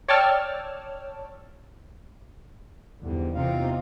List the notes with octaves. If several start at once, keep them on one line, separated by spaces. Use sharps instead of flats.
C#5 D5 G5 A5 E6 F6
E2 G#2 D3 G3
E2 C3 C4 D#4 F4 F5